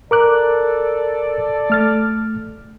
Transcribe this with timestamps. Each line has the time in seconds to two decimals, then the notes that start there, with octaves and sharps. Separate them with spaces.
0.11 A4 A#4 D5 D6 F#6
1.70 A3 F6 A6